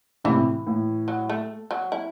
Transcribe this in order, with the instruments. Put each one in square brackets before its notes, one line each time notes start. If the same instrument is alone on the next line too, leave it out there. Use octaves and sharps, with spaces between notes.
[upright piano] A2 C3 [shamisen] E3
[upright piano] A2
[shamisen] F#3
A3
F#3
E4